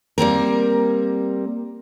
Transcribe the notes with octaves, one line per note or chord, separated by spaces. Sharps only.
G3 A#3 C4 A#4